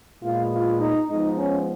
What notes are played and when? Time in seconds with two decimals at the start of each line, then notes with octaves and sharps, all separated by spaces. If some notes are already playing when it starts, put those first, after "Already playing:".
0.23 A#2 G#3 B3 F4
0.52 F4
0.80 D#4
1.09 G#2 F3 G#3 B3 D#4
1.38 C#4